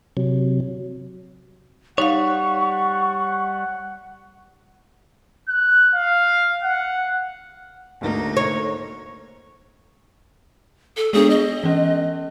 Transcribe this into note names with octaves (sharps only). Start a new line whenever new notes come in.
C3 F#3
G3 D#4 C#5 F5 F#5 C#6
F#6
F5
F#5
D2 G#2 A#3 D#4
C#5
A4
G#3 B3 D4 G#4
D#5
E3 C#4